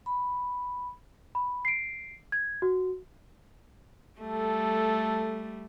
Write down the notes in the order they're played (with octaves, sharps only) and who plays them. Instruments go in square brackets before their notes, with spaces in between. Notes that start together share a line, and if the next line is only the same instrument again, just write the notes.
[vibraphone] B5
[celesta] B5
C7 D7
G#6
F#4
[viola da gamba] G3 A3 [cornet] A4